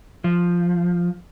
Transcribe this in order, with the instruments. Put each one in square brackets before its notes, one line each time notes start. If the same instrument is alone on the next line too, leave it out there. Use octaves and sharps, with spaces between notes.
[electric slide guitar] F3